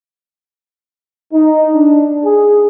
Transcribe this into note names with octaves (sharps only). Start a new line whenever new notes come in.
D#4
D4
G#4